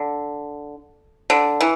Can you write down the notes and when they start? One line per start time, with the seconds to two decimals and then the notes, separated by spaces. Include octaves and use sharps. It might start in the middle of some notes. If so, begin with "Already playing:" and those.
Already playing: D3
1.30 D3
1.61 E3